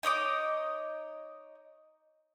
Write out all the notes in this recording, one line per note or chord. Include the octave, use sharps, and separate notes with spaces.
D#4 C#5 D#5 D6